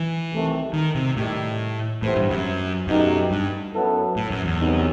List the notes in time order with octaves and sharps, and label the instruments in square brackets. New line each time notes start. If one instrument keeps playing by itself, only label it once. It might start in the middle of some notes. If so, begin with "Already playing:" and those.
Already playing: [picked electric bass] E3
[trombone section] C2 C3 D#3 A3
[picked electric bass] D#3
C3
[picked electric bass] A2 [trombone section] D#3 G3 D#4 G4
[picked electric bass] A2 [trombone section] E3 B3 E4 G4 C5
[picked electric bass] G2
F#2
[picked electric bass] F#2 [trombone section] B2 A3 D#4 G4
[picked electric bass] G2
[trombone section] F#2 F#3 B3 E4 A4
[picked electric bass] A2
F#2
E2
[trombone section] C2 C3 F#3 B3 D#4